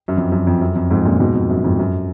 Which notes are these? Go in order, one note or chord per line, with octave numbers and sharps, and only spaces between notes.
F#2
F2
F#2
F2
F#2
F2
F2 G#2
F#2 A#2
G#2 B2
F2
F#2
F2 G#2
F#2